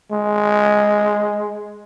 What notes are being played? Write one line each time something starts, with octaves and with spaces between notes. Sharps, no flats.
G#3